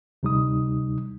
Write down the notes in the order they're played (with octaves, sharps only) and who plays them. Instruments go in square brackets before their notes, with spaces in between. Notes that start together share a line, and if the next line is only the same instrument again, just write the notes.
[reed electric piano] D2 C3 G3 D#4 D#6